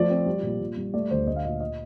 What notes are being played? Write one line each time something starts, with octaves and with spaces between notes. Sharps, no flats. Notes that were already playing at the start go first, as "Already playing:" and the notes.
Already playing: F3 A3 D5
C4
G3
A#2
A#2
G3
A3 D5
D2 C5
A3 D#5
F5
A#2 D#5
D#5